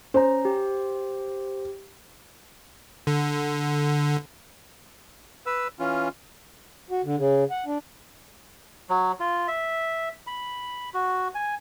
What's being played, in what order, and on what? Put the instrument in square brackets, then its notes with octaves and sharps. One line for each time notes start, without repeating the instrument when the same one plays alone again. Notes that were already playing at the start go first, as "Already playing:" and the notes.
[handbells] C#4 A#5 [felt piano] C5
[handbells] G4
[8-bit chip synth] D3
[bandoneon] B4 E6
E3 C#4 F4
[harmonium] F#4
D3
C#3
F#5
D4
[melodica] F#3
F4
E5
B5
F#4
G#5